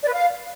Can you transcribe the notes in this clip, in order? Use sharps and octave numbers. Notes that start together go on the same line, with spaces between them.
D5
B4
F5